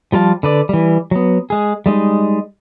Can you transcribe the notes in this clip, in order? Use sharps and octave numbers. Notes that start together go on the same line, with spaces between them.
F3 G3 F4 A5
D3 B4 D5
E3 G3
F#3 B3
G#3 G#4
G3 G#3 D#4